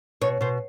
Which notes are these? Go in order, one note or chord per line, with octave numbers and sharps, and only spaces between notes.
B2 C#5
B2 C5